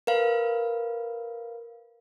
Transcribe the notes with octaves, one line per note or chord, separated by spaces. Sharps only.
A#4 B4 F5